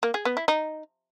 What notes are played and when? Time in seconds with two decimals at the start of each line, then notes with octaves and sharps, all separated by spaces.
0.03 A#3
0.14 G#4
0.25 B3
0.37 E4
0.48 D#4